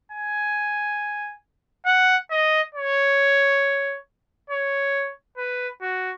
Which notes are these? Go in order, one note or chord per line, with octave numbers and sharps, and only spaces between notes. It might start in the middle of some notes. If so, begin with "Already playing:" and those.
G#5
F#5
D#5
C#5
C#5
B4
F#4